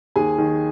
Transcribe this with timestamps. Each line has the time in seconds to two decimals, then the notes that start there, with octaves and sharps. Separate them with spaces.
0.16 D#2 G#4 G#5
0.38 D#3